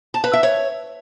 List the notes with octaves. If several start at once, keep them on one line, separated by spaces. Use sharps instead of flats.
A5
B4
E5
C#5